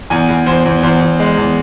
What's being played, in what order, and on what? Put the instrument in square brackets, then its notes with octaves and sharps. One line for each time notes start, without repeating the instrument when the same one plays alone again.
[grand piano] E2 G#5
E2
E2 C5
E2
E2 C5
E2
G#3
E2